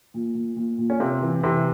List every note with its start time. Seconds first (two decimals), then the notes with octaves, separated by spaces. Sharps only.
0.14 A#2
0.35 A#2
0.56 A#2
0.78 A#2
0.90 C#4
1.00 C3 A#3 C4
1.22 E3
1.44 C3 E3 C4